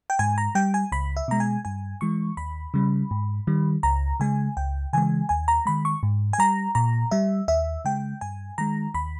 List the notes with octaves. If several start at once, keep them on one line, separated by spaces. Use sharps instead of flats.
G5
G#2 G#5
A#5
G3 G5
G#5
C#2 B5
E5
B2 G#3 A#5
G#5
G2 G#5
E3 G#3 C#6
D#2 B5
C#3 G3
G#2
D#3 G3
C#2 A#5
C#3 G#3 G#5
C#2 G5
C#3 E3 G#3 G#5
D#2 G#5
A#5
D#3 G#3 B5
C#6
G#2
G#5
G3 A#5
A#2 A#5
G3 E5
D#2 E5
C#3 G#3 G5
G2 G#5
D#3 G#3 A#5
D#2 B5